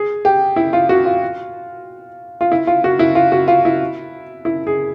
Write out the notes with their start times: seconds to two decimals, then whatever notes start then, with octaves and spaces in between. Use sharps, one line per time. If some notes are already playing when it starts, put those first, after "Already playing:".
Already playing: G#4
0.25 G4
0.56 E4
0.73 F4
0.89 F#4
1.06 F4
2.41 F4
2.52 E4
2.67 F4
2.84 F#4
2.99 E4
3.15 F4
3.32 F#4
3.48 F4
3.65 E4
4.45 E4
4.67 G#4